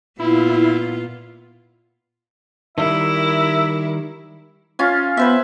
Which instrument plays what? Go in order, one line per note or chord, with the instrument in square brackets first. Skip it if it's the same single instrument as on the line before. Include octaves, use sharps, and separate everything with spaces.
[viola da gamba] A#2 B3 F4 [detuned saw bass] E4
[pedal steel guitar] D#3 G3 [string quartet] E4 A#4 [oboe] E5
[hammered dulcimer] C#4 F4
[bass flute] B3 [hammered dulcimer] B4 C5 E5